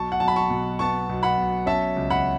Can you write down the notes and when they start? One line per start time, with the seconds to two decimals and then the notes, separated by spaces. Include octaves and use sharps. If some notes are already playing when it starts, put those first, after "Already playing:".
Already playing: B1 A5 C#6
0.12 F#5
0.20 B1 A5
0.28 B5
0.36 A5 C#6
0.50 B2
0.79 B3 A5 C#6
1.09 B1
1.23 F#5 B5
1.37 B1
1.66 C#4 E5 A5
1.96 C#2
2.10 F#5 B5